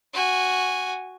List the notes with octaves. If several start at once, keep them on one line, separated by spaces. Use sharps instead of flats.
F#4 G#5